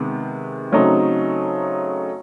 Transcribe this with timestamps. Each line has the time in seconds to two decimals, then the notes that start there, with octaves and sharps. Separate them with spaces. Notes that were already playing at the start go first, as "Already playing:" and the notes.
Already playing: C3 D#3 G#3 B3
0.72 C#3 F#3 A3 C4 D#4